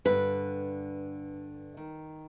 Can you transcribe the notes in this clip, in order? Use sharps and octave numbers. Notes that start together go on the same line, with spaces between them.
G2 D3 B4
D#3